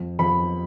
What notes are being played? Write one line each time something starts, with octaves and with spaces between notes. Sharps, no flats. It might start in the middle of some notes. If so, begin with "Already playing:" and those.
Already playing: F2
F2 B5